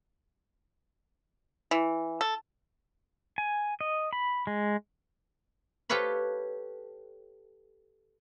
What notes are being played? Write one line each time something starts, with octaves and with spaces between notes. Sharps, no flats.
E3
A4
G#5
D#5
B5
G#3
G4 A4 B4 C#5 F5 B5